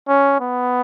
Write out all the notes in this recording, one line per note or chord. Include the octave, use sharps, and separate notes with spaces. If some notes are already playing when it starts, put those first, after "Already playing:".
C#4
B3